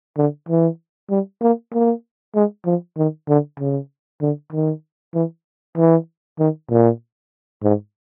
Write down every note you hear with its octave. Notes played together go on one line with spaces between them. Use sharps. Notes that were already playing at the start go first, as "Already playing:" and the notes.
D3
E3
G3
A#3
A#3
G#3
F3
D#3
D3
C#3
D3
D#3
E3
E3
D#3
A#2
G#2